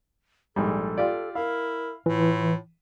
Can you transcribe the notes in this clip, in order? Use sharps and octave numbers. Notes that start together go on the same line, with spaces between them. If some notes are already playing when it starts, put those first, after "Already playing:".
A#1 G#2 G3 A4
F4 G4 D5
E4 A#4 F5
A2 E3 F4